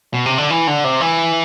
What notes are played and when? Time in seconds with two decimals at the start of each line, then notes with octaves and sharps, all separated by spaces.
0.14 B2
0.26 C3
0.38 D3
0.50 E3
0.67 D3
0.84 C3
1.01 E3